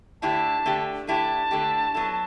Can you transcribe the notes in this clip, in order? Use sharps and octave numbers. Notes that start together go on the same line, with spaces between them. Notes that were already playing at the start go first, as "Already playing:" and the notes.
D3 A3 E4 G4 A5
D3 A3 E4 G4
D3 A3 E4 G4 A5
D3 A3 E4 G4
F#3 B3 E4 A4